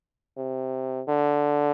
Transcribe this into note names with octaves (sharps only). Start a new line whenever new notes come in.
C3
D3